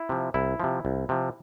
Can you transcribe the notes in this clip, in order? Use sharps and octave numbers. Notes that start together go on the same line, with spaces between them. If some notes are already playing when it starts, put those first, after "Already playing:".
Already playing: E4
C3 F3
C2 E4
C3 F3
C2
C3 F3